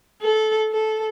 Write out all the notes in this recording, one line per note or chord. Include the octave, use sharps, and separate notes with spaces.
A4
A4